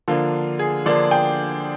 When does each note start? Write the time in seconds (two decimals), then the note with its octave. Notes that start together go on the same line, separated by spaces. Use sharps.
0.08 D3 F3 A#3 D4 F4
0.59 G#4
0.86 D3 F3 A#3 D4 D5
1.11 G5